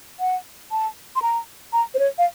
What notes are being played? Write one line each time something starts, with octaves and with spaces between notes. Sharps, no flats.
F#5
A5
C6
A#5
A#5
C5
C#5
F5